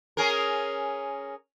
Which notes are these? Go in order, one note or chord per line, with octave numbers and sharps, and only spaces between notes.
C#4 G#4 A#4